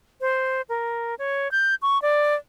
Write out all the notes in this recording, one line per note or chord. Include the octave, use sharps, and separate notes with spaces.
C5
A#4
C#5
G6
C#6
D5